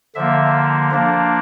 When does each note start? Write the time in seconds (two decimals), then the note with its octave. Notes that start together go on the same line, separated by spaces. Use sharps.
0.15 D3 F3 A#3 E5
0.91 F3 A#3 D4